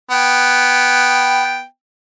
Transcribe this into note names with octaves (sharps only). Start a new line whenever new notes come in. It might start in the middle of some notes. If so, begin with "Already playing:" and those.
B3 G5